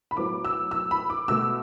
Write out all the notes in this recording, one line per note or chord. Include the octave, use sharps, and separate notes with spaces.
B5
A2 F#3 B3 D6
E6
E6
B5
D6
B2 A3 E6